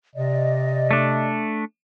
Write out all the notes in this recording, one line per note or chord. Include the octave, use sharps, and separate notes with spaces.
C3 D5 D#5
A3 D4